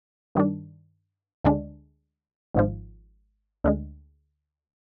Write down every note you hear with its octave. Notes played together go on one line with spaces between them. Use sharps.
G2 D#3 G3 D4
D2 D3 G#3 D4
G#1 G#2 F3
D2 D3 G#3